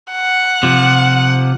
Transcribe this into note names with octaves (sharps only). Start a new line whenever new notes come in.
F#5
C3 F3